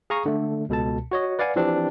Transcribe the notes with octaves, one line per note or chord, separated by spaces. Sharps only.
G#4 F5 A#5 C#6 D#6
D3 A3
C#2 B2 A4 A5
F#4 C#5 D#5
B4 D5 F5 F#5 G#5
E3 F3 C4 D4 G4